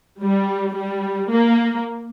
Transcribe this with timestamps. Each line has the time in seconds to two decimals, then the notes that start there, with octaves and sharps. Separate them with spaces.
0.21 G3
0.74 G3
1.30 A#3